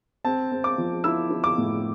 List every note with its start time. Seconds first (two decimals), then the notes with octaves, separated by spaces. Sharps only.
0.24 C4 A5
0.51 C4
0.64 D6
0.78 F3
1.04 E4 E6
1.31 E4
1.44 D6
1.58 A2